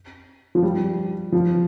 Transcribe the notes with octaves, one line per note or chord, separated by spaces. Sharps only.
F3
G3
F3